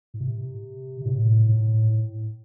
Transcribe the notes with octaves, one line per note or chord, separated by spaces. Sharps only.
A2
C3
C3
A2
A2